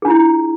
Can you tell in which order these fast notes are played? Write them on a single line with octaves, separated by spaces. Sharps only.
G#4 D4 F4 E4